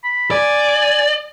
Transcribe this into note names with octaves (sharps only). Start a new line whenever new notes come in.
B5
D5 G#5